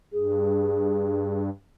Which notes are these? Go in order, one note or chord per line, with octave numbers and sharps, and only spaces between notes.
G2 G#4